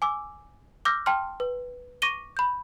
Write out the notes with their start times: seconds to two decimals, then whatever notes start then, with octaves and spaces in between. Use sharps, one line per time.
0.02 G#5 D6 E6
0.85 D6 E6 F6 G6 A#6
1.06 G5 A5 C6 F6
1.40 B4
2.02 C#6 D6 A#6 D#7 G7
2.37 B5 G6